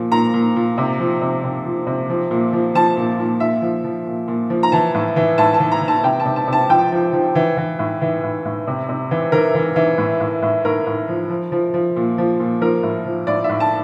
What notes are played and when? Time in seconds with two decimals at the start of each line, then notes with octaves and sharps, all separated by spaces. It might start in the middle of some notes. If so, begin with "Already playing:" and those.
Already playing: A#2 F3
0.12 A#2 A#5
0.34 A#2
0.56 A#2
0.78 C3
1.00 F3
1.22 C3
1.44 C3
1.65 F3
1.87 C3
2.10 F3
2.31 A#2
2.53 F3
2.75 F3 A5
2.97 A#2
3.19 A#2
3.40 A#2 E5
3.62 F3
3.84 F3
4.07 A#2
4.28 A#2
4.50 F3
4.63 A#5
4.72 E3 A5
4.94 A2
5.16 E3
5.38 A2 A5
5.54 A5
5.60 E3
5.72 A#5
5.81 E3
5.88 A5
6.03 C3 G5
6.20 A5
6.25 C3
6.36 A5
6.48 C3 A5
6.70 F3 G5
6.92 F3
7.13 F3
7.35 E3
7.57 E3
7.79 A2
8.01 E3
8.23 A2
8.45 A2
8.67 C3
8.89 C3
9.11 E3
9.32 E3 A#4
9.55 E3
9.76 E3
9.98 A2
10.20 A2
10.42 A2
10.65 A2 A#4
10.87 A2
11.08 F3
11.30 F3
11.52 F3
11.74 F3
11.96 A#2
12.18 F3
12.40 A#2
12.61 F3 A#4
12.83 A2
13.06 F3
13.27 A2 D5
13.44 E5
13.49 A2
13.60 A5